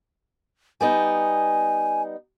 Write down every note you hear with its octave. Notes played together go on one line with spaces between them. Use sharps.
G3 B3 D#4 G#5